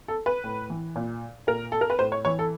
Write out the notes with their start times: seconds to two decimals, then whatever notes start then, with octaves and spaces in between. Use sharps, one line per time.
0.08 A4
0.26 B4
0.44 A2
0.70 E3
0.96 A#2
1.47 A#2 A#4
1.72 A4
1.81 A#4
1.90 B4
1.99 A2 C5
2.12 C#5
2.25 E3 C#5
2.39 A4